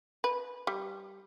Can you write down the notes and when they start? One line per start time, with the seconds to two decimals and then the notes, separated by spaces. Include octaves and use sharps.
0.24 B4
0.67 G3